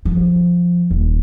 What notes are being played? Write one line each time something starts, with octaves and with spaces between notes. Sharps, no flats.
F3
D#1